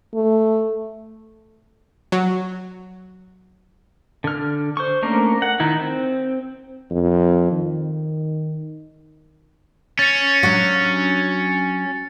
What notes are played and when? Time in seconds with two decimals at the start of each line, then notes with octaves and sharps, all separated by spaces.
0.14 A3
2.12 F#3
4.24 D3 F6
4.77 C5 C#6
5.02 A3 A#3 C#4 D4 A#4
5.42 F#5
5.60 D#3 D#4 E4
5.80 C4
6.91 F2
7.52 D#3
9.99 C#4 A6 C#7
10.43 F#3 D4 F#4